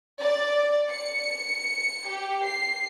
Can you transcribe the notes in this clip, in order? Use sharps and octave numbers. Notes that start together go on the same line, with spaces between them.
D5
C#7
G4
C7